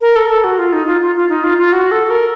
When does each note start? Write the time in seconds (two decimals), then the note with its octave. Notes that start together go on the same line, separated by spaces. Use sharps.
0.01 A#4
0.16 A4
0.30 A4
0.44 F#4
0.58 F4
0.73 D#4
0.87 F4
1.01 F4
1.15 F4
1.29 D#4
1.44 F4
1.58 F4
1.73 F#4
1.91 A4
2.10 A#4